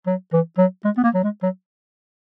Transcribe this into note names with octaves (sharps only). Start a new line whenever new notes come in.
F#3
E3
F#3
G#3
B3
A#3
F#3
G#3
F#3